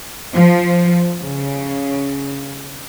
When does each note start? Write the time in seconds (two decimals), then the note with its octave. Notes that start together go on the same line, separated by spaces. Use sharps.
0.35 F3
1.22 C#3